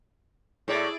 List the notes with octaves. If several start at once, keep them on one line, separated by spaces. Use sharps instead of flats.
A2 E4 G#4 C#5 D5